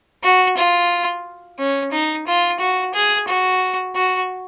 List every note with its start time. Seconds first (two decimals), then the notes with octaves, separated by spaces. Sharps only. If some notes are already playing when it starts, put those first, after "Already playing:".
0.24 F#4
0.57 F4
1.59 C#4
1.92 D#4
2.27 F4
2.60 F#4
2.94 G#4
3.28 F#4
3.95 F#4